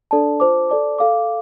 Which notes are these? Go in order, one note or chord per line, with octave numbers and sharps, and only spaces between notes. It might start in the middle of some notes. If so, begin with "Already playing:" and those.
D4 A4 D5 A5
F4 C5 A5 D6
A4 D5 A5 D6
A4 F5 D6